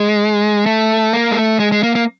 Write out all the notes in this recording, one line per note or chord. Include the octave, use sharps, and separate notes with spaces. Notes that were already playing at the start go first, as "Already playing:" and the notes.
Already playing: G#3
A3
A#3
G#3
A3
G#3
G#3
A#3
A#3